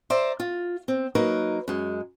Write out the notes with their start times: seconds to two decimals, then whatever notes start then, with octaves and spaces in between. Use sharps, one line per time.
0.10 C5 D5 E5 A#5
0.40 F4
0.88 C4
1.15 F#3 A#3 D#4 A#4 B4
1.68 F#2 G#3